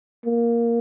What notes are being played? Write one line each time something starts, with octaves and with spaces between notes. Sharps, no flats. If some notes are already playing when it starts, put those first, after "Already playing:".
A#3